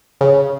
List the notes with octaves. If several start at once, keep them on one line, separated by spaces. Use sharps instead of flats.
C#3